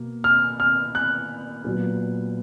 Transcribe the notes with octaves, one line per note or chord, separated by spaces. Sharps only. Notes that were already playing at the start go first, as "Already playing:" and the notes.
Already playing: B2 A#3
F6
F6
F#6
A#2 F#3 B3 F4